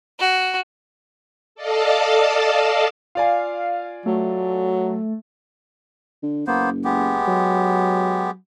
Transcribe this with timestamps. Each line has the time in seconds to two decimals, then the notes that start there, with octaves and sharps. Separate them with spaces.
0.20 F#4
1.55 A4 D5 D#5 F5 A5
3.15 F4 D5 F5 G#5
4.06 F#3 A3
6.23 D3
6.47 F#1 A#3 B3 C5
6.84 G#3 B3 G4
7.28 F#3